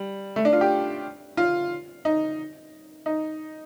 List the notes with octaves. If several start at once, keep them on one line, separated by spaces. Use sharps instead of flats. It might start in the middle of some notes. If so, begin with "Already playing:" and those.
Already playing: G3
A3
D4
F4
G4
F4
D#4
D#4